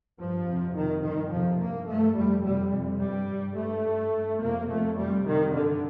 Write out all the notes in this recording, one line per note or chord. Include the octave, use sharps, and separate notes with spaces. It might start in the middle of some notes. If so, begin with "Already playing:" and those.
G2 F3
F2 C3
F2 C3 D#3
G2 D#3
F2 C3 F3
G2 A#3
G2 A3
F2 C3 G3
F2 C3 G3
F2 C3
G2 G3
G2
G2 A3
G2
G2
F2 C3 A#3
F2 C3 A3
F2 C3 G3
F2 C3 D#3
G2 D3